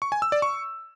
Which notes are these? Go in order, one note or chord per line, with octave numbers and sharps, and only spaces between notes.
C#6
G#5
E6
D5
C#6